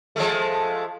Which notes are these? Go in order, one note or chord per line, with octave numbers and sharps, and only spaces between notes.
F3 G#3 A3